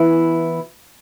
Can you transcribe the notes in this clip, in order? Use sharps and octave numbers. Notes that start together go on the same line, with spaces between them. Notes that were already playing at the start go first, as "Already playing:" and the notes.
Already playing: E3 B3 E4